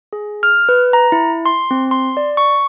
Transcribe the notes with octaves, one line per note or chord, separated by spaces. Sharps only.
G#4
F6
B4
A#5
E4
C6
C4
C6
D5
C#6